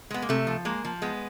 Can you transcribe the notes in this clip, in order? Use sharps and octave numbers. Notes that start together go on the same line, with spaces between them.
G#3 B3
A#3
C3 A3
F3
G#3 A#3
F3
G#3 B3